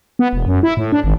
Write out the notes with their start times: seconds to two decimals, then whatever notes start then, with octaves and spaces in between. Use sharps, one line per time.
0.19 B3
0.33 E1
0.46 F#2
0.63 E4
0.77 A2
0.92 D4
1.04 G#1